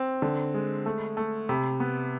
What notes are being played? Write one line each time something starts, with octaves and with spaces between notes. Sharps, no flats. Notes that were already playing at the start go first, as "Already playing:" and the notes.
Already playing: C4
D3
G#3
A3
A3
C3 B5
B3